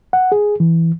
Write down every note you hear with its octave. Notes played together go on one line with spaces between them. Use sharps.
F#5
G#4
E3